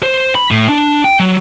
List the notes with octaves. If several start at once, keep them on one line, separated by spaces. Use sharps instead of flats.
C5
B5
A2
D4
G5
F#3